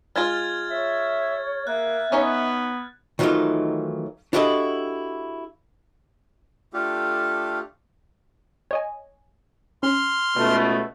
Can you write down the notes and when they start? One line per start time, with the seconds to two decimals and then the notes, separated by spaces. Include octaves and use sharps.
0.16 G#3 F4 F6 G#6 A6
0.71 C#5 E5
1.67 A#3 E5 F#6
2.12 B3 C#4 D#4 C#5
3.19 D#3 E3 F#3 A3 D#4 F4
4.33 D4 E4 F#4 G4 A4 D#5
6.74 A3 D4 F4 G4 A4 F5
8.71 C#5 D#5 G#5
9.83 C#4 C6 F6
10.36 C#2 B2 A3